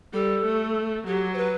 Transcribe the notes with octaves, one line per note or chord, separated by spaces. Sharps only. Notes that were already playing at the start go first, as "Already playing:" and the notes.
G3 A4
A3
F#3 G4
C5
B4